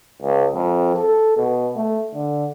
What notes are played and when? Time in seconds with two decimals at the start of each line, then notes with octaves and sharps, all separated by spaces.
0.22 C#2
0.55 F2
0.96 A4
1.37 B2
1.76 A3
2.14 D3